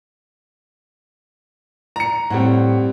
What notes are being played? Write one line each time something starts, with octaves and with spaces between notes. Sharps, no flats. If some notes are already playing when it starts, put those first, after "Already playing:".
A#5 C#7
A2 G3 C4 F#5